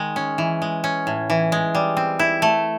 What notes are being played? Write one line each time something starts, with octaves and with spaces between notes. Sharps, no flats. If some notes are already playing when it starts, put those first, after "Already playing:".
Already playing: D#3 G#3
C#4
E3
G#3
C#4
A2
E3
G#3
G3
C4
E4
A3